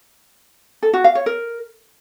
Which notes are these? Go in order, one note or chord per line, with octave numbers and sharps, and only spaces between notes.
A4
F#4
F5
C#5
A#4